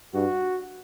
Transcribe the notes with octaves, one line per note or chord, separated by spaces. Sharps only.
G2 F#4